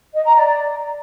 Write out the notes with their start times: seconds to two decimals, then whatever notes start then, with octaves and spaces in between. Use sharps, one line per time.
0.13 D#5
0.24 A#5
0.35 D5